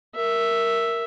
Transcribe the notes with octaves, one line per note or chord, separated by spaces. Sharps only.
A#4 E5